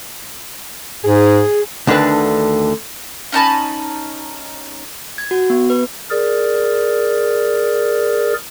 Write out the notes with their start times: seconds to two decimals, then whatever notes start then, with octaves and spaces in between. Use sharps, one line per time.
1.05 G#2 G#4
1.87 D2 D3 D#3 D4 B4
3.32 C#4 D#4 A5 B5
5.18 G#6
5.31 F#4
5.50 B3
5.70 B4
6.10 G#4 A#4 D5